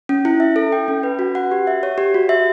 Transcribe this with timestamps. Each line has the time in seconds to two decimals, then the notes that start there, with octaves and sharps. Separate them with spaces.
0.09 C#4
0.25 E4
0.40 E5
0.56 A4
0.72 G5
0.88 C#4
1.03 B4
1.19 F#4
1.35 F#5
1.51 G4
1.67 E5
1.83 C#5
1.98 G4
2.14 F#4
2.29 E5